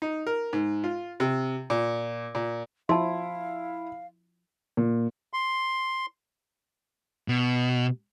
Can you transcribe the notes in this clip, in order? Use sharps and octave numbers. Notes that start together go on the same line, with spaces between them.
D#4
A#4
G#2
F4
C3
A#2
A#2
F3 E4 F5 A5 C6
A#2
C6
B2